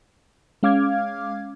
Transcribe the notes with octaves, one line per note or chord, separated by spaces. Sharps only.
G#3 C#4 F5 D6 F6 G#6